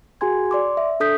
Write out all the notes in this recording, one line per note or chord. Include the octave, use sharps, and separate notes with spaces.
F#4 G#4 G#5 C6 G#6
D5 C6 D6
E5
D4 A4 D#6 G6 B6